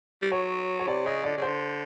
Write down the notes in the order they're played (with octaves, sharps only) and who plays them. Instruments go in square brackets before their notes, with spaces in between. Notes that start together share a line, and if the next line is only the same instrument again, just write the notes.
[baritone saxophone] G3
[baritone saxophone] F#3 [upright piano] C#5
[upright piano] C#5
[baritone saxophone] C3 [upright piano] D5
[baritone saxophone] C#3 [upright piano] D#5
[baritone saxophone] D3 [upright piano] D5
[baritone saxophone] C#3
[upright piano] C5
[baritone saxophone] D3